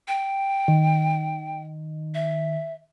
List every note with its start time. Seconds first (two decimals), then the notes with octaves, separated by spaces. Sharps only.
0.08 G5
0.68 D#3
2.14 E5